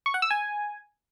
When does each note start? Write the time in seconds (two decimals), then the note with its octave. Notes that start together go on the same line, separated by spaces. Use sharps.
0.06 C#6
0.14 F#5
0.22 E6
0.30 G#5